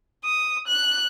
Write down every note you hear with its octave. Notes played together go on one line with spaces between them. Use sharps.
D#6
F#6